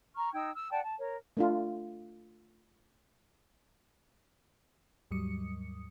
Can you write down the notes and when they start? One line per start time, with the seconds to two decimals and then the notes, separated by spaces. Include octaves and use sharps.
0.16 A#5 C#6 F6
0.33 D#4 G5 E6 G#6
0.55 E6 F6
0.71 D5 F#5 G5 A5
0.83 A5
0.98 A#4 C#5
1.37 A3 D4 F4
5.11 D#2 G#2 F#3 G3 D#6 C#7